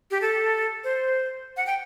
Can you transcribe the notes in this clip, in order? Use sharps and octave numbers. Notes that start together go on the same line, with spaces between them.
G4
A4
C5
F#5
G5